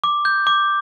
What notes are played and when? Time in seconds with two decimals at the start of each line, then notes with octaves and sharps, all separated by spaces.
0.04 D6
0.25 G6
0.47 D6